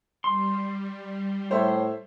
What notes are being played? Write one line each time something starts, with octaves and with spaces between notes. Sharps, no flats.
G3 C6
A2 C5 C#5 E5